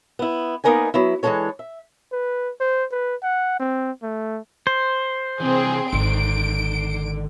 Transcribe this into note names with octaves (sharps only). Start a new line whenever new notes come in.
B3 E4
A#3 B3 D#4 A#4 D5 G#5
F#3 B3 E4
E3 G#3 A#3 D4 A4 C#5
E5
B4
C5
B4
F#5
C4
A3
C5
C3 E3 C4 G#4
G#1 D3 D#3 D7